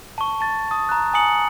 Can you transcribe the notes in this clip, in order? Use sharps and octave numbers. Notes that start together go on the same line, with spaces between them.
A5 C#6
A5 A6
A5 D#6
A#5 F#6
G#5 A#5 D#6 C#7 F#7